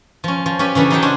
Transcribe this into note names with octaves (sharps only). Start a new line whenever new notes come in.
F3 C#4
F3
C#4 G4 B4
C#3 E3 D4 E4 A4
F#3 D#4 G#4 F#5 G5 A5
C#4 D4 F#4 G#4 C5 D#5